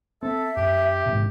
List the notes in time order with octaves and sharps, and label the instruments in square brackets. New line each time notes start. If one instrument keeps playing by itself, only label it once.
[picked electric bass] C4 [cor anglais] A4 [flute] E5
[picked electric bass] F#2 [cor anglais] G4
[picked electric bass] A1 G#2 C3